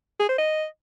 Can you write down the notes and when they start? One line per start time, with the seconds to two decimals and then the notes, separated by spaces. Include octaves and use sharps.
0.19 G#4
0.29 C5
0.38 D#5